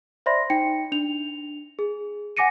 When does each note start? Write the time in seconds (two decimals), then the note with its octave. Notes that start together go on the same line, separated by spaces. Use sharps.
0.26 C5 D5 E5 B5 C6 A#6
0.50 D#4 G5 C#7
0.92 D4 F7
1.79 G#4
2.37 F#5 G#5 D6 A#6 C#7 D#7